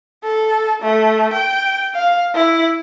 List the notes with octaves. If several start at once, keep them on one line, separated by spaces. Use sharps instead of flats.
A4
A3
G5
F5
E4